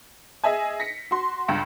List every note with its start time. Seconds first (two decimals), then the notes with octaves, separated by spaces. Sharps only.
0.44 G#4 D#5 E5 G#5
0.80 A#6 B6 C#7
1.11 F#4 C6
1.48 C#2 G2